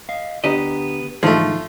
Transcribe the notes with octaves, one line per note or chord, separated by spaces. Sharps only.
D#5 F5
D2 B3 D4 G4 D#5 A#5
G#2 D3 E3 F3 A3 D#4 G#4